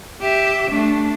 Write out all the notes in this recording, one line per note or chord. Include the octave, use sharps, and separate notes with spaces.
G4 E5
A3 D4